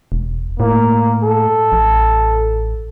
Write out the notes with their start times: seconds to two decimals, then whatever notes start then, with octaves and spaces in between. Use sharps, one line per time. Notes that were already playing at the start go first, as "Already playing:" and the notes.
0.12 E1
0.60 A2 A#3
1.24 A4
1.72 A1